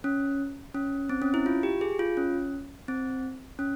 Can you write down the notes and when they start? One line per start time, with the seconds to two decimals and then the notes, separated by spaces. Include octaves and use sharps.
0.04 C#4
0.75 C#4
1.09 C4
1.22 C#4
1.34 E4
1.46 F4
1.63 G4
1.81 G#4
1.99 F4
2.17 C#4
2.88 C4
3.59 C#4